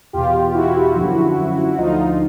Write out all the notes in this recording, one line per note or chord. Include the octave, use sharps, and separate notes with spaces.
E2 B2 F4 G4
E4 F#4
F#2 D3 F3
D2 D3 F3 D#4 F4